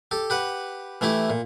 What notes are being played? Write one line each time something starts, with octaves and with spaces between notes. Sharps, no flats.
G4 A4
G4 B4 F#5
E3 A3 E4 G4
A#2